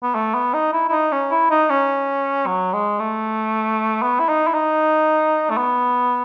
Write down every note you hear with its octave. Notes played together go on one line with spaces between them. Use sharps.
B3
A3
B3
D#4
E4
E4
D#4
C#4
E4
D#4
C#4
F#3
G#3
A3
B3
E4
D#4
E4
D#4
A3
B3